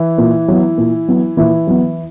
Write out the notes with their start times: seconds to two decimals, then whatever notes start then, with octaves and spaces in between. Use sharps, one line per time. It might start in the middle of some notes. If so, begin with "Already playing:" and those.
Already playing: E3 E4
0.18 A#2
0.48 F#3 B3
0.78 A#2
1.08 F#3 B3
1.37 A#2 E3 E4
1.67 F#3 B3